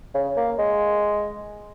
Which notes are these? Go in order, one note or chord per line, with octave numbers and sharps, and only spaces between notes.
C#3
A#3
G#3